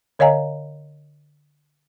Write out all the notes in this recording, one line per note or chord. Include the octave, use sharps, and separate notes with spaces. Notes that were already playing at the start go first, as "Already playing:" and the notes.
D3 C#5 D#5 F5 G#5 A#5